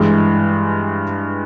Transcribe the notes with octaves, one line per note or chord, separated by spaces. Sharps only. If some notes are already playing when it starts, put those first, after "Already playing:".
Already playing: G2 E3 G#3